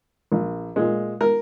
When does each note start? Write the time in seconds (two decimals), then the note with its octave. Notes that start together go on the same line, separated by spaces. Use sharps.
0.32 A#1
0.76 A#2 G#3
1.21 A#4